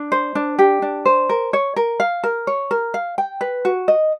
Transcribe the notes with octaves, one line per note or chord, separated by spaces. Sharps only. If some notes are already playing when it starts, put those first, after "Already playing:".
Already playing: D4
C5
D4
G4
D4
C5
A#4
C#5
A#4
F5
A#4
C#5
A#4
F5
G5
B4
F#4
D#5